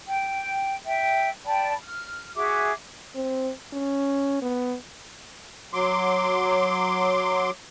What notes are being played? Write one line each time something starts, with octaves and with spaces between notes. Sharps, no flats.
G5
E5 G5
D5 G5 A5 B5
F6
F#4 G#4 E5 D6
C4
C#4
B3
F#3 C6 D6